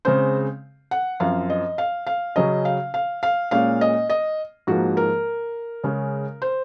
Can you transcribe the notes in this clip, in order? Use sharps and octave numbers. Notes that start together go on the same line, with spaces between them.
C#3 G#3 C4 C5
F#5
F#2 F3 C4 F5
D#5
F5
F5
C#3 F#3 C#4 D#5
F5
F5
F5
A#2 G#3 C#4 F5
D#5
D#5
G#2 F3 A#3 F#4
A#4
C#3 G#3 C#4
C5